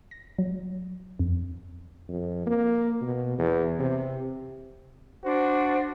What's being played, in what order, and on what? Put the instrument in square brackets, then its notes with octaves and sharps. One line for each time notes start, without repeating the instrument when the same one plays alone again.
[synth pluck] A#6
F#3
F2
[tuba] F2
A#3
B2
E2
C3
[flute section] D4 C5 [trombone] F#4